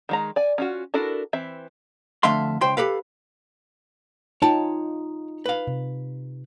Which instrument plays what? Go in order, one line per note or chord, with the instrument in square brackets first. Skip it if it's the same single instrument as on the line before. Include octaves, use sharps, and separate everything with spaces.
[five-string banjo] D#3 G#3 A#5
D5 G#5
C#4 F4 F#4
D4 E4 F#4 A4 A#4
E3 C4 E5
[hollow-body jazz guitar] F2 D3 A3 E5 F5 C6
C#2 C5 G5 C6
G4 A4 B4 F5
[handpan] D#4 F4 [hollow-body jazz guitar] C#5 G5 A5
[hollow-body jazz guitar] B4 F5
[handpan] C3